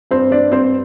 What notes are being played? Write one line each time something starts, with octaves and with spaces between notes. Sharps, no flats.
G2 C4 C5
G2 D4 D5
G2 C4 C5